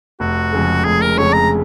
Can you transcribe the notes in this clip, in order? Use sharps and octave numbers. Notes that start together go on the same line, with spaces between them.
F1 F#4
F2 C#3 G#3
F1 G#4
A#4
F2 C#3 G#3 C#5
A#5